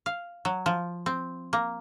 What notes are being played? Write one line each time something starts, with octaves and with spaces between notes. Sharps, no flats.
F5
F#3
F3
C4
A#3